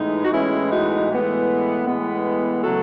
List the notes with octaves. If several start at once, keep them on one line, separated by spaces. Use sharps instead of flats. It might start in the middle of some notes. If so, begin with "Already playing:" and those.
Already playing: A2 E3 G#3 B3 D#4
F#4
A2 E3 G#3 B3 C#4 E4
D#4 F#4
A2 E3 G#3 B3
A2 E3 G#3 B3
C#3 F#3 A3 F#4 A4